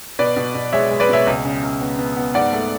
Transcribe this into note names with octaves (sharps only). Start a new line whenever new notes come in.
B2 B4 D5
B2
B2
G#3 C#5 E5
G#3
B4 D5
B2 C#5 E5
C#2
C#3
C#2
B3
B3
B3
G#2 D5 F#5
A3